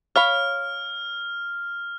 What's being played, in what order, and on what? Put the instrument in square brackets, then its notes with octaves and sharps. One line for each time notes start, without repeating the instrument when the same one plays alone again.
[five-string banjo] C#5 F5 B5 [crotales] F6